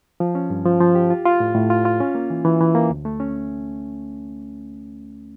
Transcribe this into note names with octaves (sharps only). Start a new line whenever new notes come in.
F3
C#4
G2
F3
F3
G4
F4
F4
A2
A2
F4
F4
C#4
A#3
E3
E3
E3
A#3
D2
A3
C#4